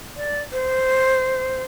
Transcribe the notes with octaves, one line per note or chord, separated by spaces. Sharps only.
D5
C5